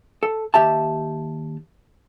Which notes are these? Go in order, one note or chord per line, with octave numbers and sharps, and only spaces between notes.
A4
D#2 G4 E5 A5